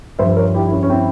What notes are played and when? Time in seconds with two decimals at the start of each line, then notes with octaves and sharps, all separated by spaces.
0.19 G2 F3 C5 E5
0.36 A#4 C#5
0.54 E4 G4
0.66 E4
0.72 C#4
0.83 C#4
0.90 C4 E4